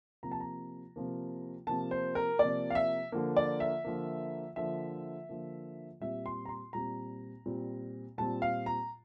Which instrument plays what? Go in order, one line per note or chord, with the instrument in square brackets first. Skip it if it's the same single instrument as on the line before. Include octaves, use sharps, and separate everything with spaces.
[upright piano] C3 F3 A#3 A#5
A5
A#5
C3 F3 A#3
C3 F3 A#3 A5
C5
A#4
C3 F3 A#3 D5
F5
E5
D3 F3 A#3
D5
E5
D3 F3 A#3
D3 F3 A#3 E5
D3 F3 A#3
A#2 G3 C4 E5
C6
A#5
C6
A#2 G3 C4 A#5
A#2 G3 C4
A#2 G3 C4 A5
F5
A#5